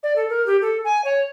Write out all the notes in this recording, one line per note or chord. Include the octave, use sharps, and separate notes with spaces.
D5
A4
A#4
G4
A4
G#5
C#5